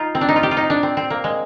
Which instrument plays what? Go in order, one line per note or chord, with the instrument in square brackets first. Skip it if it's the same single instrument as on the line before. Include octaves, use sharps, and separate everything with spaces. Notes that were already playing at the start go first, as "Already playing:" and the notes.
Already playing: [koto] D#4 F4
C4
D4
D#4
F4
G4
F4
D#4
D4
C4
C4
A#3
G#3